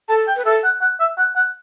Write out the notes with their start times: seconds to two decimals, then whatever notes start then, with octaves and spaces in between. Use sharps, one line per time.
0.09 A4 A5
0.27 G5
0.36 B4
0.45 A4 E5
0.64 F#5
0.81 F#5
1.00 E5
1.18 F#5
1.36 F#5